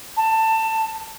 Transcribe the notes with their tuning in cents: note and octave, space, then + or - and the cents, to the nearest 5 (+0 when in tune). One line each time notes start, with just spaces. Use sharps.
A5 +20